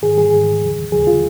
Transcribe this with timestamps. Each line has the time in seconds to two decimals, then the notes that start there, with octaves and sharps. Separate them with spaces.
0.02 G#2 D#3 G#4
0.18 G#4
0.33 G#2 D#3
0.62 D#2 C#3 F3
0.92 D#2 C#3 F3 G#4
1.07 F4